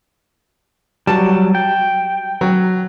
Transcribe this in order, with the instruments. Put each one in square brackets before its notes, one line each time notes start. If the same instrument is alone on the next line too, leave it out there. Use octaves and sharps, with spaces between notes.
[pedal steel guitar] F#3 G3 [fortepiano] A5
[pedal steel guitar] G5
[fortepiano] F#3